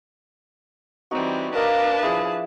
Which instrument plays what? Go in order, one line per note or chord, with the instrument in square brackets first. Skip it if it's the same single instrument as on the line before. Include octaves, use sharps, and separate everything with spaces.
[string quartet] E3 G3 C4 [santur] D#4 F#4
[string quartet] D4 B4 A5 [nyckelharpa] A#4 [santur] D#5 F5 D6
[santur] F3 E4 [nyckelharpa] G#4